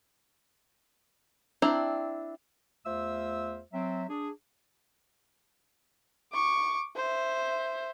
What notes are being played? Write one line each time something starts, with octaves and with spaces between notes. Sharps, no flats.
C4 D4 E4 A#5
E2 A3 F4 C5 E5 E6
F#3 C4 E5
D4 G#4
C#6 D6
C5 E5